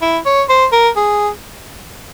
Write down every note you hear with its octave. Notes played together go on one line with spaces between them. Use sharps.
E4
C#5
C5
A#4
G#4